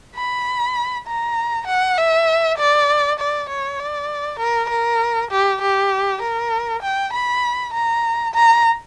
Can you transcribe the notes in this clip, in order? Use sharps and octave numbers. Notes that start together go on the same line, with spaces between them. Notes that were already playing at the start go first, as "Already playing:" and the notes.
B5
A#5
F#5
E5
D5
D5
C#5
D5
A#4
A#4
G4
G4
A#4
G5
B5
A#5
A#5